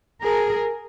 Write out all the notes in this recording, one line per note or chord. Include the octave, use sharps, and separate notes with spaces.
G#4 A#4